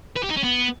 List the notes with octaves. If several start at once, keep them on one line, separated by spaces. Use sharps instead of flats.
B4
G4
D#4
C#4
B3